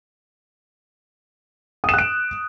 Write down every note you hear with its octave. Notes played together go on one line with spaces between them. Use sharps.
D#6 F#6 D7 E7